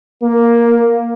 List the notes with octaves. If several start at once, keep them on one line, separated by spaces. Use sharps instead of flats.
A#3